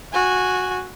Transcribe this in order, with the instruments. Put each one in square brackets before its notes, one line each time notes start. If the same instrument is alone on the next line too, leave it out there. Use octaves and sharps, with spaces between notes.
[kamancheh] F#4 G#5